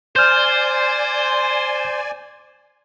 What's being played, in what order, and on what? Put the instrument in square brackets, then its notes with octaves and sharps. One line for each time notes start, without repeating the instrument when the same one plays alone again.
[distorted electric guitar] C5 [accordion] D5 G#5 [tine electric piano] F6 G6